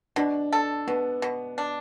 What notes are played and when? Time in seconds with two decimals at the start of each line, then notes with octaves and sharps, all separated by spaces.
0.16 B2 D4
0.53 A4
0.87 B2 B3
1.22 B2
1.58 D4